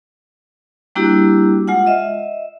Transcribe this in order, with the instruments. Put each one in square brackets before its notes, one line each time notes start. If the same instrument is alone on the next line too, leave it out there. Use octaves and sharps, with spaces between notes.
[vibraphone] G3 A#3 D4 E4 F#4 G4
G#3 F4 F#5
D#5 E5